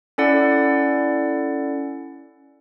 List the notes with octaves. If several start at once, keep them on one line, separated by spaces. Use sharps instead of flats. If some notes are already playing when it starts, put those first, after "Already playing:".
C#4 E4 A4 D5 F#5